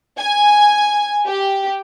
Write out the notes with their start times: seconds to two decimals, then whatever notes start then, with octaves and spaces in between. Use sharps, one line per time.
0.18 G#5
1.26 G4